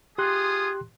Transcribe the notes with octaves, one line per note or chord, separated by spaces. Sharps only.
F4 G4 G#4 C6 D#6 F#6